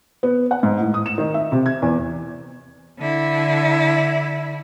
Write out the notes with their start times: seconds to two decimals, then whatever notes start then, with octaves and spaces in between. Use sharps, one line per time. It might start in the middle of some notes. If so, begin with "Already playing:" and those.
0.23 B3
0.51 F#5
0.63 G#2
0.80 A2
0.94 D#6
1.06 E7
1.18 D#3
1.34 E5
1.52 C3
1.66 G#6
1.82 E2
2.99 D3 E4